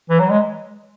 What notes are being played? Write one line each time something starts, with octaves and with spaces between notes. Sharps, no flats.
E3
F#3
G#3